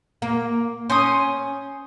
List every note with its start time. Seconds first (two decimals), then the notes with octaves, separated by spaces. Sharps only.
0.22 A#3
0.90 C#4 C5 G#5 D#6